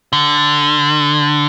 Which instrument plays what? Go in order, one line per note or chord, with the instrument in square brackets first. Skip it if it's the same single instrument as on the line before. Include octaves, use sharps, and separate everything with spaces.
[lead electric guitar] D3